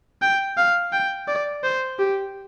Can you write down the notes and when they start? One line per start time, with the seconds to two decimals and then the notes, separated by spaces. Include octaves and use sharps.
0.22 G5
0.57 F5
0.93 G5
1.28 D5
1.64 C5
1.99 G4